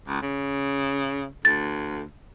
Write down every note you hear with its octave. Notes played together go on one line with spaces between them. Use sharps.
C#2
C#3
D2 A6